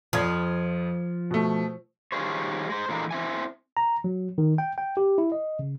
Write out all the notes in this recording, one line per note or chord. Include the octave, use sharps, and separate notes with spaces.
F2 F3 G#6
B2 A3
D#3 G3 F4 G#4 C5 C#5
G#3 C5
A#2 D3 E3 G#3 A#3
C4 E4 G#5
A#5
F#3
D#3
G5
G5
G4
E4
D#5
C#3